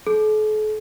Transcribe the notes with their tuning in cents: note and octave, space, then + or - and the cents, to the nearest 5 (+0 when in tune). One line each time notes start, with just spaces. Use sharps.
A4 -45